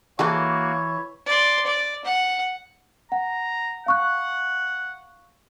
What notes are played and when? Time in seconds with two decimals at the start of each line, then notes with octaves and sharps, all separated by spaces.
0.19 E3 A#3 F#4 G#4 A4 B4 C#5
1.26 D5 C6
1.66 D5
2.05 F#5
3.12 F#5 A#5
3.86 F5 F#5 C#6 F#6